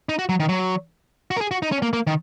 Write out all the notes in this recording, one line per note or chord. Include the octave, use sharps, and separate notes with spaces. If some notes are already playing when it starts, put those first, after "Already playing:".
D#4
F#4
F#3
D#3
F#3
F#4
A#4
G#4
F#4
D#4
C#4
A#3
A#3
D#3